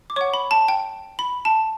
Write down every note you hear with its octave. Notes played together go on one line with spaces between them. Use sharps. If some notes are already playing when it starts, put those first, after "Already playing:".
D6
C#5 F#5 C#6
B5
A5
G5
B5
A5